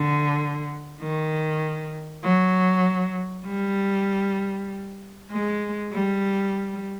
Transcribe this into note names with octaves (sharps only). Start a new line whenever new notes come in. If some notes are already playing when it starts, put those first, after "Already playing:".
Already playing: D3
D#3
F#3
G3
G#3
G3